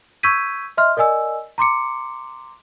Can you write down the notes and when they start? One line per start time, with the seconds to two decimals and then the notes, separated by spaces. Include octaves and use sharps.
0.23 C#6 E6 G6 G#6 B6 D#7
0.77 D#5 E5 C6 F6
0.97 A#4 D5 D#5 G#5 E6
1.58 A#5 C6 D6 C#7